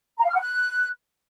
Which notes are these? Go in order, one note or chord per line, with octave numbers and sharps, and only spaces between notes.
A#5
F5
F6
F#5
F#6